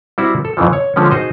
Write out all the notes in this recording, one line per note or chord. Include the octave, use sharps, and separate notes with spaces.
G3 C4 E4 F#4
A4
F2 C#3 E3 F3
C#5
D3 F3 G#3 C#4
D#4 F#4 G#4 C5 D#5